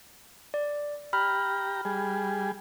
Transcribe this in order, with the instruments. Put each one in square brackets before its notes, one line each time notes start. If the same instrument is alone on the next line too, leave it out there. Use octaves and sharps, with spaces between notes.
[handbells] D5
[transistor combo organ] G4 A#5 [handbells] B5 F6
[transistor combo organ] G3 G#4